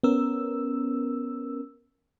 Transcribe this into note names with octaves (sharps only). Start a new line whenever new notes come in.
B3 C#4 A#4 E6